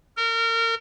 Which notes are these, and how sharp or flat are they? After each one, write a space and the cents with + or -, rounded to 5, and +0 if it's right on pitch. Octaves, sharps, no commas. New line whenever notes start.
A#4 -30